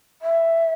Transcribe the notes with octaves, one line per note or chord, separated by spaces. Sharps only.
E5